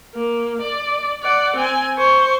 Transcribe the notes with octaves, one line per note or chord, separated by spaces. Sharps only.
A#3
D5
D5 F#5
C4 G#5
C5 C#6